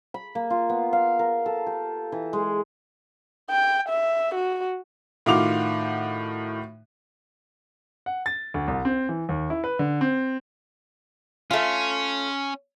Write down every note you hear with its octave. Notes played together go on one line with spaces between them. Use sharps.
B5
A#3
F4
B3
F5
A#4
A4
G4
E3
G#3
G5
E5
F#4
A2 D#3 F4 F#4 D6 F7
F#5
A6
D2
C2
C4
E3
D#2
E4
B4
D3
C4
A3 C#4 F4